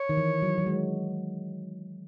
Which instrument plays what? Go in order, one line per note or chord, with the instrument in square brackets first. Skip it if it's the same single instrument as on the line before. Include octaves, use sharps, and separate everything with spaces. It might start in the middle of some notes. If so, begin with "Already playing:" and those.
Already playing: [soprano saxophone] C#5
[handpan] D#3
E3
F#3
F#3
G#3